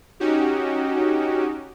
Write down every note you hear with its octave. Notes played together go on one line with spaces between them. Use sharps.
C#4 D#4 F#4 G4